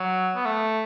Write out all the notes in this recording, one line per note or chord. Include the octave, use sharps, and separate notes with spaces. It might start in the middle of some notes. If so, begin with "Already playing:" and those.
Already playing: F#3
B3
A3